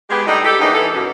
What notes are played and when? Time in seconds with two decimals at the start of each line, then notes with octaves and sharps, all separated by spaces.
0.10 G#3 B3 G4
0.27 A2 G3 D4 D#4
0.45 G4 A4
0.59 E2 D3 E3 A#3 C#4 D#4
0.73 E3 A4
0.94 F#2 B2